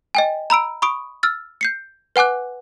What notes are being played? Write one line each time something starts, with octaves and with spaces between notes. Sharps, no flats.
D#5 G5 G#5
A#5 B5 E6 D7
B5 C#6 D#6 D7
E6 F6 A6
G6 C7 C#7
B4 F#5 G#5 D6 F#6